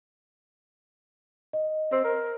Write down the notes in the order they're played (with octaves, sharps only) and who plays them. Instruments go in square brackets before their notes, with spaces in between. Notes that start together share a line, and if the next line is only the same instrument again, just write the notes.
[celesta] D#5
[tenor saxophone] C4
A#4